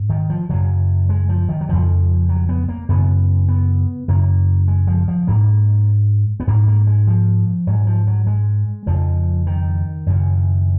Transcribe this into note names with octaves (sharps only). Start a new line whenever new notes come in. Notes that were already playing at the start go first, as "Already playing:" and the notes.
Already playing: G#2
D#3
F3
F#2 C#3 F#3
G#3
F3
D#3
F#3
F2 C#3 F3
F#3
B3
A#3
F#2 C#3 B3
B3
F#2 C#3 A#3
G#3
F3
F3
G#2 A#3
B3
G#2 A#3
A#3
G#3
F3
G#2 F#3
F3
F#3
G#3
F2 C#3 F3
D#3
F#2 C#3